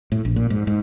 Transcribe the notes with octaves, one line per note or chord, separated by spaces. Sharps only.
A2
A#1
A#2
G#2
G#2